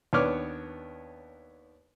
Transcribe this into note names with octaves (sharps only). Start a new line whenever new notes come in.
D#2 B3 D4 C#5 D6 F6